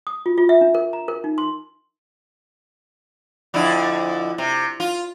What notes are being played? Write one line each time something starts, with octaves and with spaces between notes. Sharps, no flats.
D#6
F4
F4
E5
D4
A#4
A#5
A#4
D#4
C6
F2 D3 E4
C3
F4